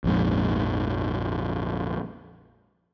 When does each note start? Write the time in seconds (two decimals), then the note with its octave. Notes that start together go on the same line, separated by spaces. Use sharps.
0.04 A#1 F2 G#2